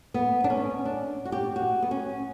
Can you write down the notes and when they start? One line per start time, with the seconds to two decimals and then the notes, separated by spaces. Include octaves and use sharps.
0.14 B3
0.44 D4
0.50 C#4
0.85 D4
1.25 F#4
1.32 G4
1.56 F#4
1.82 B3
1.91 C#4